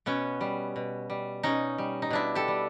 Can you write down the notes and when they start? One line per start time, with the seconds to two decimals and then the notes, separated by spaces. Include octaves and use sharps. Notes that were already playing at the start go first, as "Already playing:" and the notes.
0.06 B2 B3 C#4
0.41 G3
0.76 B2
1.10 G3
1.43 B2 C#4 D#4
1.78 G3
2.02 D#4
2.11 B2 D4 E4
2.35 G4 A4
2.48 G3